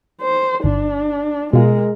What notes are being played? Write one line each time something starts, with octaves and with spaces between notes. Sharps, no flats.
C5
G1 D4
B2 G#3 F4 A#4